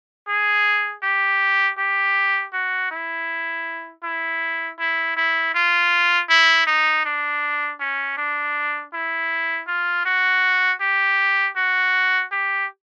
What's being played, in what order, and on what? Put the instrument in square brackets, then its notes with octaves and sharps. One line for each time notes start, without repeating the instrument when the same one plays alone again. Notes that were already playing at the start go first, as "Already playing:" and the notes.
[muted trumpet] G#4
G4
G4
F#4
E4
E4
E4
E4
F4
E4
D#4
D4
C#4
D4
E4
F4
F#4
G4
F#4
G4